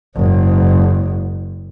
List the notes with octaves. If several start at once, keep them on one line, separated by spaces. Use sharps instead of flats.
F#1 G#2